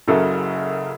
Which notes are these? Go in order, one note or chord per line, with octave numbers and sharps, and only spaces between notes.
F#1 F#2 C#3 F#4 A4 A#4